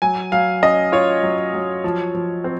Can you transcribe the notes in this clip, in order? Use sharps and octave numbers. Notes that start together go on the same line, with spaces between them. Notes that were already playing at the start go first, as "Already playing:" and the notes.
F#3 G#5
F#3 F5
C#4 D#5
F4 C#5
F#3
F#3
F3
F3
C4